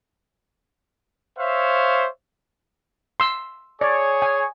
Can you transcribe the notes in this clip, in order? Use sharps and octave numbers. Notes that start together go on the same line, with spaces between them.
C5 C#5 E5 F5
C6 E6
G#4 C#5 D5
G#5